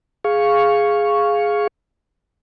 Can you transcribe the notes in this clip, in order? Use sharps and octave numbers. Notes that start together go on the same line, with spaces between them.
G#4 F5 C#6